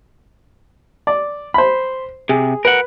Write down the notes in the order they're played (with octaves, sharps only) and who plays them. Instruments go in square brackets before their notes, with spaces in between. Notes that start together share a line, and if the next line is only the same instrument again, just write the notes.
[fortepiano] D5
C5 B5
[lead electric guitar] C3 [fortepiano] G#4
[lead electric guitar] A#4 F#5 [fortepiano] B4